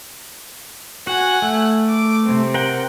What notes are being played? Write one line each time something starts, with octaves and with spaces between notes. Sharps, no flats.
F#4 F#5 G#5
A3
D6
C3 C4
A#4 F#5 G5